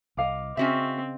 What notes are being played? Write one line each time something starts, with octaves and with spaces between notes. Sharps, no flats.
C2 D#5 F5 D6
C#3 C4 C#4 F#4 E5